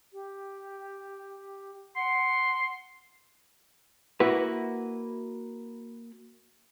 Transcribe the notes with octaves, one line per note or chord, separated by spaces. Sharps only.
G4
F#5 C6
A#3 E4 F#4 B4